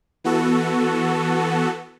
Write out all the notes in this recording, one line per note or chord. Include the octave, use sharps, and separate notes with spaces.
E3 B3 F#4 A4